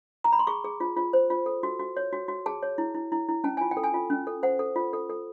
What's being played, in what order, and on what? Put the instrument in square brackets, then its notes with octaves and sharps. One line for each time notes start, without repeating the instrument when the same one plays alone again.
[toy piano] A#5
B5
C6
G#4 C#6
G#4
F4
F4
C5
F4
A4
F#4
F#4
C#5
F#4
F#4
G#4 A5
C#5
E4
E4
E4
E4
C#4 A5
F4 G#5
G5
A4
G#5
F4
C#4
A4
C5 F#5
A4
F4
A4
A4